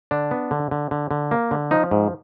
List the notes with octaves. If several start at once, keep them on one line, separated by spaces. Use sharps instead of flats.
D3 D4
B3
D3
D3
D3
D3
A#3
D3
F3 D#4
G#2